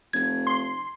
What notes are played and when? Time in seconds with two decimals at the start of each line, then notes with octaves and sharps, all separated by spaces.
0.13 F1 G#6
0.47 C6